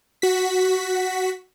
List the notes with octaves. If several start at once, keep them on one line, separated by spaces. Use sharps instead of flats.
F#4 B6